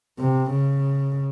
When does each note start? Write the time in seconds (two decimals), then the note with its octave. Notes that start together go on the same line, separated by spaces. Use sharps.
0.19 C3
0.51 C#3